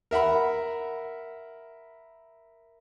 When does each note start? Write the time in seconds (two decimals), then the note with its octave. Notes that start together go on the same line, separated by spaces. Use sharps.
0.11 A#4 E5 F#5 B5